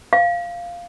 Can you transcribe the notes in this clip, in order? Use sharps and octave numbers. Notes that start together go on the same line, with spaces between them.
F5